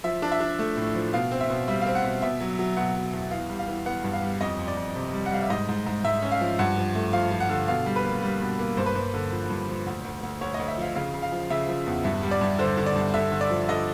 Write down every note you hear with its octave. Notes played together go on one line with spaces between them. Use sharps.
F3 E5
D4
E5
D4
A3
A2
F3
B2 F5
C4
E5
B2
G3 E5
F5
C4
F#5
B2
B2 E5
F#3
F#3
B2 F#5
F#3
E2
E3 F5
G3
F5
E3
B3 F#5
G2
F5
G3
F2 D#5
F2
D5
F2
C3
G3
F#5
G3 F5
E5
G#2 D#5
G#2
G#2
G#2 E5
C#4
F5
F3
G2 F#5
F3
A3
F3 F5
F3
F#5
D3
B2 F5
G3
B4
A#3
G3
B2
A#3
G2 C5
B4
G2 C5
D3
F3
G2
F3
D2
D2
D2
D2 C#5
D#5
D2
E5
F3 F5
C#3 F5
C#3
F5
F3
C#3 E5
F3
E2
G2 E5
G3
D5
G2
D3 C5
D3
D5
G2
D3 E5
D3
D5
F3
D3 D#5